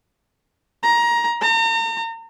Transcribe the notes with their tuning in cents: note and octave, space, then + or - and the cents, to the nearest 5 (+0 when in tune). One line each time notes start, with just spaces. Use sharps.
A#5 +20
A#5 -40